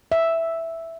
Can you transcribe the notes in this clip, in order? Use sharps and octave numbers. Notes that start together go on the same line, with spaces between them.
E5